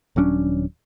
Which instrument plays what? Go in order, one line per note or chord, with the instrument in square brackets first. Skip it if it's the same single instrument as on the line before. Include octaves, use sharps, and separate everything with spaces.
[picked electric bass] D#1 F#3 C#4 D4